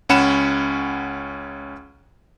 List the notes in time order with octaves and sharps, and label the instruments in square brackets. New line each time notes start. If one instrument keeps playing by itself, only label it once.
[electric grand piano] C#2 C#4 F#5 B5 C#7 E7